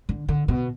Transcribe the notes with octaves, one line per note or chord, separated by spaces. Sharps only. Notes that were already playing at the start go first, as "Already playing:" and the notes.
D3
D3
B2